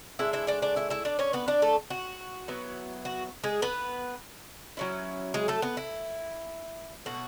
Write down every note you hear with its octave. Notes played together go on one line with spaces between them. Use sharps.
A2 G#3 D4 E4 E5
E4 E5
D4 D5
D4 D5
E4 E5
E4 E5
D4 D5
C#4 C#5
B3 B4
D4 D5
A3 A4
F#4
F#3 B3 E4
F#4
G#3 G#4
B3 B4
F#3 C#4 E4
G#3 G#4
A3 A4
B3 B4
E4
B2 F#3 A3 F#4